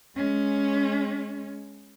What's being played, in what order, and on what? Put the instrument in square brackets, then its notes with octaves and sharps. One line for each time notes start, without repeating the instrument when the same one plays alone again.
[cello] G#3 C#4